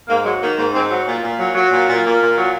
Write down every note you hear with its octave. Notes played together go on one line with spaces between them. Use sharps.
G#2 A#3
F#3 G#3
D#3 A#3
G#2 A#3
G#2 G#3 C4
F#3
A#2
A#2
F#3
F#3
A#2
A#2
A#2 A#3
A#2
F#3